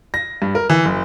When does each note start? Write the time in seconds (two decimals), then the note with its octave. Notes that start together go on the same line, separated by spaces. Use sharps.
0.14 A#6
0.42 G2
0.55 A#4
0.70 E3
0.85 F#1